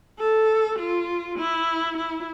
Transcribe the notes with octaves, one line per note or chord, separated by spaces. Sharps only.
A4
F4
E4
E4